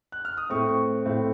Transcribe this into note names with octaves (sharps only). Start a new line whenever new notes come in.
F#6
F6
D#6
A2 A3 C4 C#6
C#6
A2 A3 C4